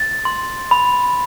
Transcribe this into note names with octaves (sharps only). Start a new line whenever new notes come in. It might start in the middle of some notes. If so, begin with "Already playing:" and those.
Already playing: A6
C6
B5